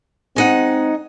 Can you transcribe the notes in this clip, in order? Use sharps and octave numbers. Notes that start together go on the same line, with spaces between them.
G#3 C4 D#4 F#5